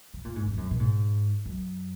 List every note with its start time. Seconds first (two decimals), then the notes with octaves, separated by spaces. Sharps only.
0.14 C#3
0.25 A#2
0.36 G#2
0.47 F2
0.53 G#2
0.57 F#2
0.71 A#2
0.79 G#2
1.46 F#2